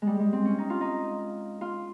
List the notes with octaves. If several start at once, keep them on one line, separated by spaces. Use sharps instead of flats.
G3 G#3
G#3
C4
C#4
D#4
F4
D#4
F4